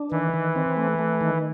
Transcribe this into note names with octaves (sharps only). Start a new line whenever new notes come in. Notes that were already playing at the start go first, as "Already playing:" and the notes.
Already playing: D4
D#3 E3
D#3
C4
A3
A3
D#3